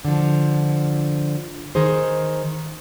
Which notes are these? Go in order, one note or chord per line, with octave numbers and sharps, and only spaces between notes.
D3 F3
D#3 D#4 G#4 C5